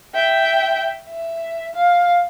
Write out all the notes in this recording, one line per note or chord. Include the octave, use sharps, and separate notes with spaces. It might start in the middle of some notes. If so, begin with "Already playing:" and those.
E5 G5
E5
F5